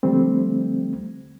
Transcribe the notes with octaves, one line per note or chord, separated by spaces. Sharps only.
D3 F3 G3 A3 C4